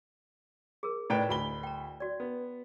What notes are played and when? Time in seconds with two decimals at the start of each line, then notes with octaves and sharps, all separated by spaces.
0.83 G#4 A#4
1.10 A2 B4 D5 D#5 G5
1.29 D2 E4 B5 G7
1.63 G5 A#5
2.00 F#4 D5
2.20 B3